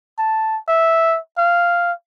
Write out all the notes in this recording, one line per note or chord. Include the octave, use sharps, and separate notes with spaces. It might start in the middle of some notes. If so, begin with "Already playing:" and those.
A5
E5
F5